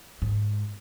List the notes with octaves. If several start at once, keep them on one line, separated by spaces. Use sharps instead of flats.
G#2